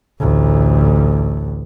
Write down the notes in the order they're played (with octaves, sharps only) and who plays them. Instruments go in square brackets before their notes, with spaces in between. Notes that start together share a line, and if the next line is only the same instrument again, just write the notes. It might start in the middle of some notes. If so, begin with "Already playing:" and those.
[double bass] A1 D2